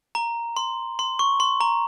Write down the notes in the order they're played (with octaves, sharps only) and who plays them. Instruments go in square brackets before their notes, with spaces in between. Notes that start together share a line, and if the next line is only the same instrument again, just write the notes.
[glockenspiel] A#5
C6
C6
C#6
C6
A#5